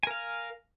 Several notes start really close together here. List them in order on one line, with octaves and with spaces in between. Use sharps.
G#5 A#4 F5